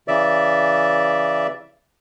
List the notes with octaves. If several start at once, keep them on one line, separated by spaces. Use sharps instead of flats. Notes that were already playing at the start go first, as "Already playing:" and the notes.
C#3 E3 D5 E5